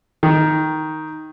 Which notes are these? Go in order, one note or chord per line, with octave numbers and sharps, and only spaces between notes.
D#3